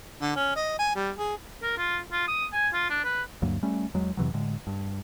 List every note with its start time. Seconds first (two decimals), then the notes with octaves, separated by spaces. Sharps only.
0.22 D3
0.36 C#4
0.56 D#5
0.79 G#5
0.95 G3
1.18 G#4
1.63 A#4
1.78 F4
2.12 F4
2.28 D#6
2.53 G#5
2.73 F4
2.90 D4
3.04 B4
3.42 D2 G2 F#3 A#3
3.63 G3 A3 C#4
3.94 E2 F#3 G#3
4.17 F2 C3 E3 F#3
4.34 A2 D3 G#3
4.67 G2